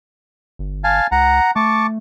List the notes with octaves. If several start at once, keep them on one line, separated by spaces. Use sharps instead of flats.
G1
F5 G#5 A5
C#2 F#5 A#5
A3 A5 C#6 D6